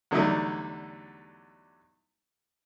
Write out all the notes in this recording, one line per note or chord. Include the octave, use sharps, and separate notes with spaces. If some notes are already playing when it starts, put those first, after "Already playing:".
E2 D3 F#3 G3 A3 D#4